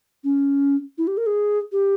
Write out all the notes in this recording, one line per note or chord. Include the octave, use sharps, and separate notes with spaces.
C#4
E4
G4
A#4
G#4
G4